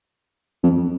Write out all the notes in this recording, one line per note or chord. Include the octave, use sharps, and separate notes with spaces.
F2